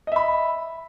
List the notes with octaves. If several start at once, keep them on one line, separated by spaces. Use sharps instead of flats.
D#5 E5 B5